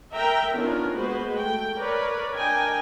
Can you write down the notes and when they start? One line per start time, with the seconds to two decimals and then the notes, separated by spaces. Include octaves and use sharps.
0.13 A#4 E5 G5 A#5
0.53 D#3 B3 C#4 D4 F4 A#4
0.96 G#3 A#3 B3 F#4 B4 C5
1.38 A3 G5
1.77 A#4 B4 C#5 D5
2.33 D4 A#4 D#5 G5 G#5